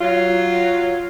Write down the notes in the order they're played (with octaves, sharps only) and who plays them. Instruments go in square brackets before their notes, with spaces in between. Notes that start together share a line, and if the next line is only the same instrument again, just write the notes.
[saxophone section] F#3 F4